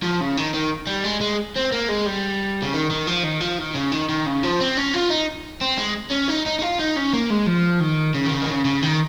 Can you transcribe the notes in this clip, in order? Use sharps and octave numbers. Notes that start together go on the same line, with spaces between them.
F3
C#3
D#3
D#3
G3
G#3
G#3
C4
A#3
G#3
G3
C#3
D#3
D#3
F3
D#3
F3
D#3
C#3
D#3
D#3
C#3
F3
C4
C#4
F4
D#4
C4
G#3
C#4
D#4
D#4
D#4
F4
D#4
C#4
A#3
G#3
F3
D#3
C#3
D#3
C#3
D#3
C#3
C#3
D#3